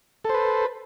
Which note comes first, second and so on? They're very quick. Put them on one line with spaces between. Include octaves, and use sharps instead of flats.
A4 C5 B4